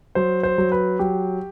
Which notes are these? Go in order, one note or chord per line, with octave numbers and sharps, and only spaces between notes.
F#3 C5
C5
F#3
B4
F#3 G4